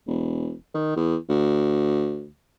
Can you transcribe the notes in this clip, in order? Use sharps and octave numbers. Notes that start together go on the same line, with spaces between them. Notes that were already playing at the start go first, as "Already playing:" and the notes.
E1
D#3
E2
D2